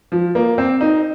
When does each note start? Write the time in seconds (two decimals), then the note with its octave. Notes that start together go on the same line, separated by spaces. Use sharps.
0.12 F3
0.35 A#3
0.58 C4
0.81 D#4